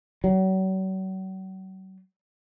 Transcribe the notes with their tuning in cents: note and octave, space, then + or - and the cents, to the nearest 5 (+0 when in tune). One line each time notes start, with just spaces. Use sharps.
F#3 +40